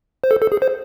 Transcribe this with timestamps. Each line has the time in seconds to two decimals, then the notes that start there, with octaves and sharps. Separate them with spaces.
0.24 C5
0.31 A4
0.42 A4
0.52 G#4
0.62 C5